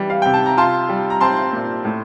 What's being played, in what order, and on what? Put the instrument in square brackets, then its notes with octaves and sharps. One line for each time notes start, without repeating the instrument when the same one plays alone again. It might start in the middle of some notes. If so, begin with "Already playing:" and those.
Already playing: [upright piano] E3 G3
F5
C3 G5
A5
A#5
F4 A5 C6
G3
A#5
C4 A5 C6
A#2
A2